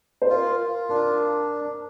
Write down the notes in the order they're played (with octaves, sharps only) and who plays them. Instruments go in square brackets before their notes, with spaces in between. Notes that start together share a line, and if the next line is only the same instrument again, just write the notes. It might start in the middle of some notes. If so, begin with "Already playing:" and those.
[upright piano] C5
[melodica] F4 [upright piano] A#4
[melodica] F4
[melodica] D4 [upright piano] A#4